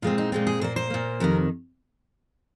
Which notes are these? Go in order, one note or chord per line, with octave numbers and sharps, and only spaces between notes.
A#2 G#3 C4 F4
D#4
A#2 G#3 C4 F4
G#4
A#2 A#3 C5
C5
A#2 A#3
F2 C3 D#3 A#4